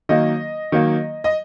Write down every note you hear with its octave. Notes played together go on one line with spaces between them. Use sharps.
D#3 F#3 A#3 D#5
D#3 F#3 A#3
D#5